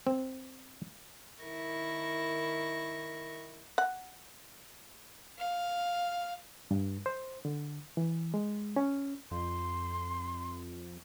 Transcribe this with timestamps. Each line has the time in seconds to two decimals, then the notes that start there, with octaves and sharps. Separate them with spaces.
0.07 C4
1.42 D#3 E4 A#4 C#6 A#6
3.78 F#5
5.38 F5
6.71 G2
7.06 C5
7.45 D3
7.97 E3
8.34 G#3
8.76 C#4
9.31 F2 C6